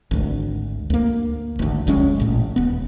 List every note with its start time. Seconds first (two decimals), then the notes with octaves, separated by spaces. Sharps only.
0.11 G#1 D2
0.90 D2 A#3
1.59 G#1 D2
1.87 F1 C#2 G#3 C#4
2.20 A1 A#2
2.56 D#1 B3